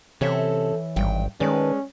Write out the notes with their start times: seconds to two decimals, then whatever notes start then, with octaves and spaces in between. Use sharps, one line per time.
0.21 C3 E3 C4 C#4 A4 C#5 E5
0.96 G#1 G2 G5
1.40 D#3 G#3 C#4 B4 D5 A5